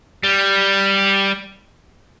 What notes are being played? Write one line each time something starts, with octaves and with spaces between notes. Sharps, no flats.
G3